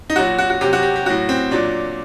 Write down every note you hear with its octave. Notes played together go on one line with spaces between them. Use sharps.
D#4
A#2 F#3 F#4
F#4
F#4
C3 F#3 G4
F#4
G4
G4
A2 F#3 F#4
C4
A#2 F#3 D4